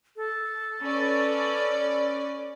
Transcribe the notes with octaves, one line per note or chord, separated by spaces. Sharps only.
A4
C#4 B4 D5